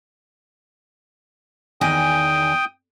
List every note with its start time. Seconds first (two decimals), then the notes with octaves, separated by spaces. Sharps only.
1.81 E2 D#3 G5 G#5 D#6